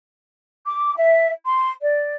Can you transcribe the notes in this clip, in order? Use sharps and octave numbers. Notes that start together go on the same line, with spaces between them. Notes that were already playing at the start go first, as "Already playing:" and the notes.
D6
E5
C6
D5